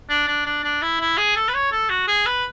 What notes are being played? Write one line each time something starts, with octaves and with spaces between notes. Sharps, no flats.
D4
D4
D4
D4
E4
E4
G#4
A4
B4
C#5
A4
F#4
G#4
B4